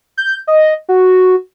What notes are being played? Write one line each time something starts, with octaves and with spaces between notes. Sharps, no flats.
G6
D#5
F#4